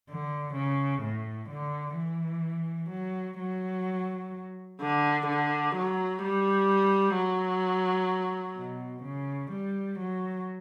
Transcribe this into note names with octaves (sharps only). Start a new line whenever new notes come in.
D3
C#3
A2
D3
E3
F#3
F#3
D3
D3
F#3
G3
F#3
B2
C#3
G3
F#3